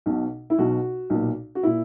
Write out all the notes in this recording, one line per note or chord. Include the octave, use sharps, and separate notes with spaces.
B1 B2
E4
B1 B2 F#4
B1 A#2
F#4
A#2 E4